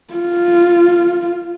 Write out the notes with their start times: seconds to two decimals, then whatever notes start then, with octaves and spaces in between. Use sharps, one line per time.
0.14 F4